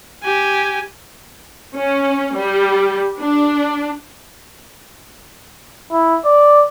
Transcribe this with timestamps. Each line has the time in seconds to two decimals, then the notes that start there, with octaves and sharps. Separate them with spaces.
0.24 G4 G#5
1.75 C#4
2.36 G3
3.21 D4
5.92 E4
6.25 D5